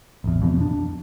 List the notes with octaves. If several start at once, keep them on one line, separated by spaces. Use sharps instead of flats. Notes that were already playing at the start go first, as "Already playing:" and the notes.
A1 E2
F2 B2
D4